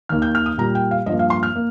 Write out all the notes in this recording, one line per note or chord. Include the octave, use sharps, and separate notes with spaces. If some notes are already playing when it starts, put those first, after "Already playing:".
D#2 D#3 A#3 F6
G6
F6
D#6
A#2 G3 A#3 A#5
G5
F5
G2 F3 A#3 D#5
F5
C6
F6
A#3